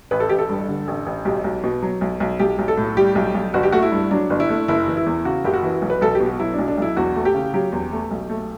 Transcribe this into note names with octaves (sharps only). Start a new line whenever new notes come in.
A1 B4
A4
A1 G4
A4
G2
D3
A1
A1
B1 G4
B1
B2
F#3
B1
B1
B1 G4
B1
A4
A2
G3 G4
B1
B1
G1 F#4
G4
A3 F#4
E4
G2
F#3 D4
G1
E4
A3
F#1 E4
E3
E4
E2
C#3 F#4
F#1 G4
F#4
E3
B1
B4
B1 A4
G4
B2
F#4
F#3 E4
D4
B1
D4
B1 E4
E2 F#4
A3
G4
C#3
F#3 G4
E2
A3
B1
A3